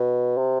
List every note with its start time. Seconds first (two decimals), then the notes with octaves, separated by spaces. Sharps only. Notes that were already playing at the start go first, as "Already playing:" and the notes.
Already playing: B2
0.38 C3